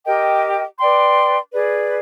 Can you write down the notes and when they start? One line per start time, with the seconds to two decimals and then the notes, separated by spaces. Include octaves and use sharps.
0.05 G4 A#4 D#5 G5
0.79 B4 D5 G5 C6
1.53 G#4 B4 D5